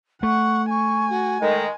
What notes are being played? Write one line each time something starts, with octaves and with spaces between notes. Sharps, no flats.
A3 F#5 C#6
G#5 C#6
F#4
D#3 G#3 A4